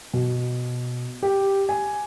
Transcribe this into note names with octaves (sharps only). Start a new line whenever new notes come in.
B2
G4
G#5